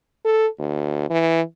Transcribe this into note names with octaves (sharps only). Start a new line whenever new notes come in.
A4
D2
E3